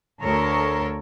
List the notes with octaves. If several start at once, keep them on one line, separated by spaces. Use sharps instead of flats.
D2 A4 A#4 C#5